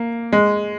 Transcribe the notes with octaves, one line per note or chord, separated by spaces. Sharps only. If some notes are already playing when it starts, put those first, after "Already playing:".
Already playing: A#3
G#3